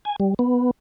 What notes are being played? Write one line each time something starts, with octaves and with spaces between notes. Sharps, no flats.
G#5
G3
B3